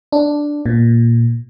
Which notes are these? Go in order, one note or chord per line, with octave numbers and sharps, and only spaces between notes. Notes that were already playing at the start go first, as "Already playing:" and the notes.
D4
A#2